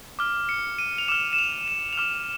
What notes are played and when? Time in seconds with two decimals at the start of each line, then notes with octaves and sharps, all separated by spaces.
0.19 D6 F6
0.49 C#7
0.79 D#7
0.98 F7
1.08 D6 F6 E7
1.33 E7
1.39 F7
1.68 E7
1.93 F7
1.97 D6 F6 E7